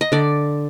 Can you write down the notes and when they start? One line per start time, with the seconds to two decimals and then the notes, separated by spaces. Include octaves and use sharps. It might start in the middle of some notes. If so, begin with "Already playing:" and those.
0.01 D#5
0.12 D3 D5